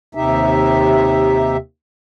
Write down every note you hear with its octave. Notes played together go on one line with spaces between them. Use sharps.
D#2 C3 D#4 G4 E5